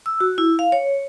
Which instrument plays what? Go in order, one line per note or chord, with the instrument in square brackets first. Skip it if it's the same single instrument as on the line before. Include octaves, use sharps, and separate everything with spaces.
[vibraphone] E6
F#4
E4
F5
C#5